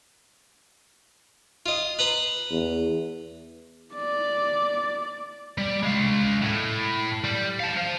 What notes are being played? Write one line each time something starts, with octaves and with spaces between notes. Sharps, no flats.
F4 D#5
B4 A#5 C6
E2
D5
G3
G#3 F5
A2
G3
F5 A5
C5 F5